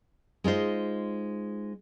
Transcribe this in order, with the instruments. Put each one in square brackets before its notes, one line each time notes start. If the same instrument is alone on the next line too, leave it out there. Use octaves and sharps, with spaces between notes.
[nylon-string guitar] G#3 D#4 F4 C5